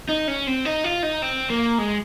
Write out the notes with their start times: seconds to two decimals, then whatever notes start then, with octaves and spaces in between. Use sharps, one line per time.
0.09 D#4
0.28 C#4
0.47 C4
0.65 D#4
0.84 F4
1.03 D#4
1.22 C4
1.50 A#3
1.78 G#3